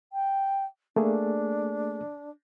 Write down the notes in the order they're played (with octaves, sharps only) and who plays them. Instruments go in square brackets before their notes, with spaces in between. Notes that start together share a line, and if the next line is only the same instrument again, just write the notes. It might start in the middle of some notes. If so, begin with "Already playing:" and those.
[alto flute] G5
[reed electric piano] A3 A#3 G#4 [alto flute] D4